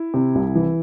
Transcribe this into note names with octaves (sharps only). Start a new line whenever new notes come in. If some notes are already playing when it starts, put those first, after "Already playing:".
Already playing: E4
C3
C2
E3